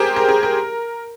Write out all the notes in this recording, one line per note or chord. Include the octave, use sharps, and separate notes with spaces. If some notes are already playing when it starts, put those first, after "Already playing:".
Already playing: G4 G#4 A#4 C5
A#4
G#4
A#4